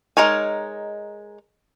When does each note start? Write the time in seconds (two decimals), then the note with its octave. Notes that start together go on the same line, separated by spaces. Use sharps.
0.17 G#3 D#4 A#4 C#5 G#5